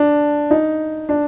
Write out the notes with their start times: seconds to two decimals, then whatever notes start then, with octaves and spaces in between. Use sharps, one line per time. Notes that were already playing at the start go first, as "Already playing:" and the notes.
Already playing: D4
0.51 D#4
1.09 D4